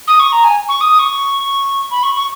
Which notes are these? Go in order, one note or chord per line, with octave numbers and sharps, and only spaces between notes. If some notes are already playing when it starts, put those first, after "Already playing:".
D#6
C#6
A#5
G#5
C#6
D#6
C#6
B5
C#6
C#6